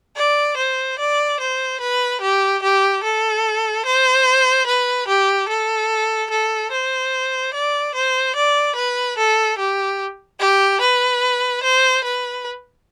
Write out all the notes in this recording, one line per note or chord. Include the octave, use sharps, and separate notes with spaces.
D5
C5
D5
C5
B4
G4
G4
A4
C5
B4
G4
A4
A4
C5
D5
C5
D5
B4
A4
G4
G4
B4
C5
B4